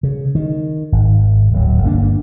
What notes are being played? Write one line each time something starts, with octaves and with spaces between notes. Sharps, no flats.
C#3
D#3
G#1
D1 F#3
G1 A#3 D4